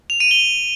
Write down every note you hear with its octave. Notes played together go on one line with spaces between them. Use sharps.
F7
D#7
G7